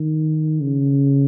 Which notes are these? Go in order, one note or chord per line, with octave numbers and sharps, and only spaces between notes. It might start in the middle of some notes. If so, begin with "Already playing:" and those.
Already playing: D#3
C#3